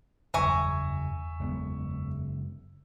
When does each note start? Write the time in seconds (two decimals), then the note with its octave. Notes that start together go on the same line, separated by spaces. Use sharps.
0.34 F#1 E2 G2 E5 G#5 A#5 C#6
1.40 F#1 G#3 B3